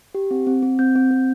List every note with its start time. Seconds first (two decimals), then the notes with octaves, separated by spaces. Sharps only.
0.15 G4
0.31 C4
0.47 C4
0.62 C4
0.79 C4 G6
0.95 C4
1.11 C4